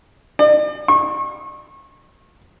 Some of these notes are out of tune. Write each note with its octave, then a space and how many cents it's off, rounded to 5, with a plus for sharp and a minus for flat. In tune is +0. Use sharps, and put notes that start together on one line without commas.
D5 +45
C#6 -35